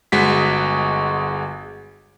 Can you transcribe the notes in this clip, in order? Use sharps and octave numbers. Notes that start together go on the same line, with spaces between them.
G1 G#3 F#4 B6